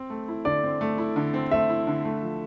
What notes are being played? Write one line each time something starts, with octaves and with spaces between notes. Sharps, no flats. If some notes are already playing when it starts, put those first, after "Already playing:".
Already playing: C4
A3
E4
D3 D5
C4
A3
E4
D3
C4
A3 E5
E4
D3
A3
F3